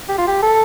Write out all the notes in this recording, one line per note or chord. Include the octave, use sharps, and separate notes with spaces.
G4
F4
G4
A4